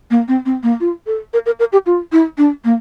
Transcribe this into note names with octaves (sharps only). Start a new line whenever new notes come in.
A#3
C4
C4
A#3
F4
A4
A#4
A#4
A#4
G4
F4
E4
D4
A#3